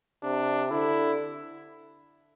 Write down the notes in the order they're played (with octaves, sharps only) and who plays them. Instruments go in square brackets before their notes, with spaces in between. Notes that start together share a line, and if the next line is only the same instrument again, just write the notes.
[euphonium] C3 [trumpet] D4
[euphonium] D3 [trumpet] E4